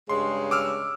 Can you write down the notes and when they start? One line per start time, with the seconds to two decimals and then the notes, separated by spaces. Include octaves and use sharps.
0.09 G2 C#3 G#3 C6
0.51 D6 E6 F6